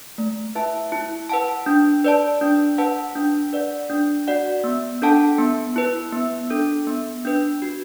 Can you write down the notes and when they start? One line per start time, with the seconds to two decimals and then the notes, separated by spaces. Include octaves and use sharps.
0.18 A3
0.55 E4 B4 E5 A5
0.92 E4
1.29 B4 F#5 A5
1.66 D4
2.04 B4 D5 A5
2.41 D4
2.78 B4 F#5 A5
3.15 D4
3.53 B4 D5 F#5
3.90 D4
4.27 F#4 D5 F#5
4.64 B3
5.02 D4 A4 F#5 A5
5.38 B3
5.76 E4 B4
6.13 B3
6.50 D4 A4
6.87 B3
7.25 D4 B4
7.62 F#4